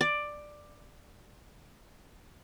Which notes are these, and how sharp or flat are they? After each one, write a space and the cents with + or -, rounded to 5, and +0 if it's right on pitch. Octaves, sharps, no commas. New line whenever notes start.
D5 +10